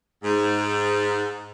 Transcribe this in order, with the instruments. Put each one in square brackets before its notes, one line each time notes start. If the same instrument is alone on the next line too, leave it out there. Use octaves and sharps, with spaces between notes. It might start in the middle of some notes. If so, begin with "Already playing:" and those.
[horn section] G#2